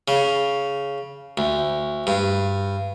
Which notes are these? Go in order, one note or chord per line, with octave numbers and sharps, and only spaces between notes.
C#3
D2
G2